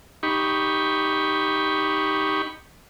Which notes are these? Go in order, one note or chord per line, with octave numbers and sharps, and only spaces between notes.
D#4 G4 B5 C#6